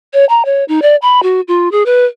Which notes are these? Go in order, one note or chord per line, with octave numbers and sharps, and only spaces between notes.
C#5
A#5
C#5
D#4
D5
B5
F#4
F4
G#4
B4